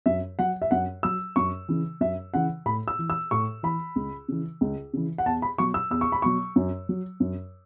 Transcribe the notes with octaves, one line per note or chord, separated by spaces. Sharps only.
F#2 E5
F#3 F#5
E5
F#2 F#5
F#3 E6
F#2 C#6
C#3 E3
F#2 E5
C#3 E3 F#5
A2 B5
E6
E3
E6
A2 C#6
E3 B5
C#2
C#3 E3
C#2
C#3 E3
F#5
E2 A5
B5
B2 F#3 C#6
E6
E2 E6
C#6
B5
B2 F#3 C#6
F#2
F#3
F#2